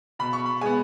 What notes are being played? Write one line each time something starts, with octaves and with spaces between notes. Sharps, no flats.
B2 B5
C#6
B5
G#3 B3 G#5